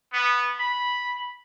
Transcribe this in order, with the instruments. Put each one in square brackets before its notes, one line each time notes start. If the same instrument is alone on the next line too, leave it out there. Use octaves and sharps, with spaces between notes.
[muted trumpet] B3
B5